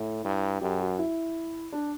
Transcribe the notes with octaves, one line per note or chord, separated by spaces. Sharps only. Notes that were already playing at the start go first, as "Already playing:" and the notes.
Already playing: A2 E4
G2
F#2 G4
F#4
E4
D4